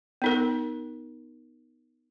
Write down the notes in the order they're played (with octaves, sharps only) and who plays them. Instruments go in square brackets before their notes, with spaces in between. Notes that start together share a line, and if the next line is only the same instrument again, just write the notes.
[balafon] B3 D#4 A#4